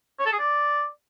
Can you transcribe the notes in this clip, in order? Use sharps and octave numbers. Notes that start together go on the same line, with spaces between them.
C#5
A4
G#4
D5